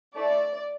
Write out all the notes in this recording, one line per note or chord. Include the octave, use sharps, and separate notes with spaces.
A3 E4 A4 D5